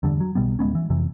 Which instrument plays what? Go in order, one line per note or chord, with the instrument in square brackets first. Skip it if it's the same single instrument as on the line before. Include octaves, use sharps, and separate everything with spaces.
[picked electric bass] E2 G2 D3
F#3
B1 B2 G3 B3
D1 G#3 B3 C#4
E3
F2 C3 E3